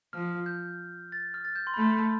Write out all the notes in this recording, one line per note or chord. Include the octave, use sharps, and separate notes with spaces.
F3 F6
G6
A6
F6
A6
G6
C6
B5
A3 C6